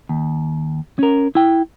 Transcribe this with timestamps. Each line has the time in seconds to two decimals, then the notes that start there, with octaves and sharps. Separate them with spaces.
0.09 D#2
0.99 C#4 A#4
1.35 E4 G5